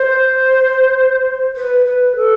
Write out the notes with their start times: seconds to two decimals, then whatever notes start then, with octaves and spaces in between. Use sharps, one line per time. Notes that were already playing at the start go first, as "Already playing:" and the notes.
Already playing: C5
1.56 B4
1.86 B4
2.17 A4